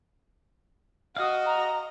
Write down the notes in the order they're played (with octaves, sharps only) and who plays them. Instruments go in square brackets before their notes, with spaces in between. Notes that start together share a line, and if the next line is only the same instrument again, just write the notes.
[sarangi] F#4 [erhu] D#5 [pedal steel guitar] F5 D#6
[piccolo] A#5